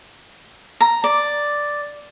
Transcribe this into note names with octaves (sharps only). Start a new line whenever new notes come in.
A#5
D5